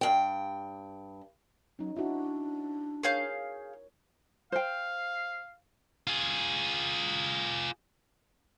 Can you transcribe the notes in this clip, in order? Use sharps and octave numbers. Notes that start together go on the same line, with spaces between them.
G2 G5
F#3 C#4 D#4
D4 E4 F#4
G#4 A#4 C#5 F5 G6
C5 F5 G5
F4 G#4